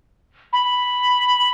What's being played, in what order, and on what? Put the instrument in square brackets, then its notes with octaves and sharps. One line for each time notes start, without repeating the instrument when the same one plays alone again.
[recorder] B5